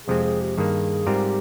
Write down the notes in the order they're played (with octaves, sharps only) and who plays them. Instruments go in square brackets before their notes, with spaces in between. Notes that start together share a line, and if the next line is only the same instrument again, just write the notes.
[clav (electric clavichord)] F2 C3 F3 G#3 C4 [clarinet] G#4
[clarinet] G#4
G4
[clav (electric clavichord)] G2 D#3 A#3 [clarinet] G#4
[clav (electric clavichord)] G#2 G3 C4 F4 A#4 [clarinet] G4